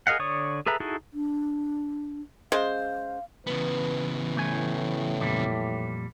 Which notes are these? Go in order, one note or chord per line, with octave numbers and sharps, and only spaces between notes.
G#4 A#4 D#5 F5 F#5
D3 C#5 D5 C#6 D#6
G#4 A4 B4 E5 A#5
D#4 E4 F#4 G#4 A4
D4
C#3 G#3 C5 F5
C#3 E3 B3 B4
A2 A3 G#5
F2 A#2 G3